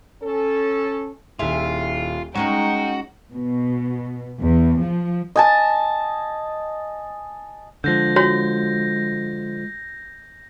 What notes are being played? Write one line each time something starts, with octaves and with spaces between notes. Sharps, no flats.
C#4 A4
D#1 E4 F4 G#4 E5
G#3 C#4 D#4 F#4 D#5 G5 A#5
B2
E2
F3
D#5 G#5 A5
D3 F3 G#3 G6 A#6
F#4 C#5 A#6